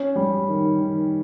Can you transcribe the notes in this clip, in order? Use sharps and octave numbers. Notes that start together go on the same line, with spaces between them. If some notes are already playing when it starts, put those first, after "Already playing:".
Already playing: C#4
G3
D#3
D#3